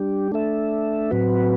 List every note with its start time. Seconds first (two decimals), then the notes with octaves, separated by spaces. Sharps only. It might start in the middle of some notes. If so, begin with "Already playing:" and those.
Already playing: G3 D4 G4
0.32 A3 D4 A4 E5
1.11 A2 F#3 C4 F#4 B4